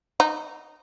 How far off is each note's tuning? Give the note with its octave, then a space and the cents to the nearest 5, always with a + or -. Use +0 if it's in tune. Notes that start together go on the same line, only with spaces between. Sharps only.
D#4 -15